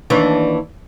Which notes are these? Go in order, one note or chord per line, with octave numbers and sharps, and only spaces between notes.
D#2 E3 D4